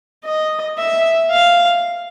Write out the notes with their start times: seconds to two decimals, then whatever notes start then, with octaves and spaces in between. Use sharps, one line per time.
0.25 D#5
0.78 E5
1.30 F5